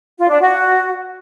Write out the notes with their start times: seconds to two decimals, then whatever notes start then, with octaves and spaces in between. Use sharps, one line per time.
0.18 F4
0.29 D4
0.40 F#4